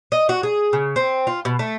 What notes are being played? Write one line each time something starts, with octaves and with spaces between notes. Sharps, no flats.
D#5
F#4
G#4
C#3
C4
F4
B2
A3